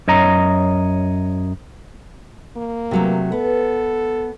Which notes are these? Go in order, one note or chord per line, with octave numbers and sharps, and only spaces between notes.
F#2 C#5 D#5 A#5
A#3
C3 F#3 A3
B3 A4